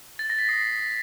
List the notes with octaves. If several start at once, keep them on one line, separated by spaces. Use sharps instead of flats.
A6
A#6
B6
D#6 C7
D#6